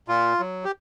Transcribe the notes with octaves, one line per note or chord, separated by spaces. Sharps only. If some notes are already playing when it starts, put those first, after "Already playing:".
A#2 F4
F#3
G4